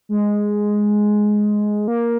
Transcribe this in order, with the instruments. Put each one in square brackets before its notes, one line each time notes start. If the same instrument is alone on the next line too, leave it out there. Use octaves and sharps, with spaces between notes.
[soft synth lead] G#3
A#3